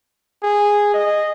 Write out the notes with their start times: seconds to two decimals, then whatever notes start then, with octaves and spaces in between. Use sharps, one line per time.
0.43 G#4
0.94 D#5